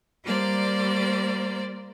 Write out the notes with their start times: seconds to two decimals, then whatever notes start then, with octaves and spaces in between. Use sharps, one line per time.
0.25 G3 A#3 C5 D5